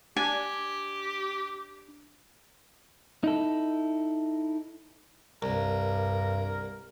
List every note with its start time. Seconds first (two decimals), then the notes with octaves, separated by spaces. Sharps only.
0.17 D4 G4 G#5
3.24 D#4 E4 A4
5.42 C2 G2 A#4